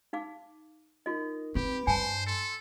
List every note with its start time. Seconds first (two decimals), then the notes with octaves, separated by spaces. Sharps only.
0.13 D#4 F5 D6
1.06 D#4 F4 A#4 D#5
1.55 C4 G4 B4 B5
1.87 G2 C5 G#5 A5
2.26 A4 C6 E6